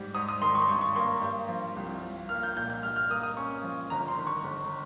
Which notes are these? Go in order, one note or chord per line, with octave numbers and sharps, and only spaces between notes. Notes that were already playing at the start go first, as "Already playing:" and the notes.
Already playing: G#2 G3
G#2 D#6
D#6
D#3 C6
C#6
C6
G2 C#6
C#6
A#3 C6
G2
F3
C2
F3
A#3 F6
G6
A#2 G6
G6
G2 F6
F6
A#3 D#6
D#6
C#4 C#6
F3
G1 A#5
C6
D#3
C#6
G1